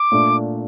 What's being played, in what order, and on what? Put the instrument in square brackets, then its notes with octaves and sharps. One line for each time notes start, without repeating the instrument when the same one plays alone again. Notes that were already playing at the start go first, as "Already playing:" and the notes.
Already playing: [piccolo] D6
[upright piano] A#2 A3 D4